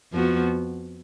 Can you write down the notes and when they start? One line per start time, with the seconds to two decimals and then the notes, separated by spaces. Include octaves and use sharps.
0.13 F2 F3 B3 F#4